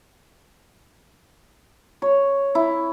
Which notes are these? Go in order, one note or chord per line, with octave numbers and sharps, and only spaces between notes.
C#5
E4